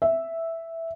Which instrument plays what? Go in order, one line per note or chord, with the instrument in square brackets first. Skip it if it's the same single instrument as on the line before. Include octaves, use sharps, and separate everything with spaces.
[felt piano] E5